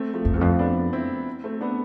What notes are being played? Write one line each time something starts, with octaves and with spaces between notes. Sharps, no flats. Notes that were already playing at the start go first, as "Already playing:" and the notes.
Already playing: A3 C4
F3 A3
F2
E2
F2 A3 C4
B3 D4
C4 E4
A3 C4
B3 D4